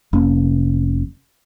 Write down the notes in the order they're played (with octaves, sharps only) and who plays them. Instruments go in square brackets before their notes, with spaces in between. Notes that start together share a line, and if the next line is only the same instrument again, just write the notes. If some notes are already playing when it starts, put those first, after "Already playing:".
[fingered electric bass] F1 C3 A#3 C#4